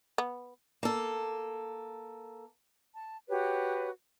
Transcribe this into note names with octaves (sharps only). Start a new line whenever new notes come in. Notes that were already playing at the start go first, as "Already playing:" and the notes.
B3
A#3 A4
A5
F#4 G4 B4 C#5